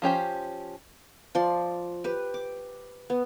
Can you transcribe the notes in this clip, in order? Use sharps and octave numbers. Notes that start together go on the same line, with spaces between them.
F3 C#4 G4 C5
F3 D5 C6
G4 B4
D6
B3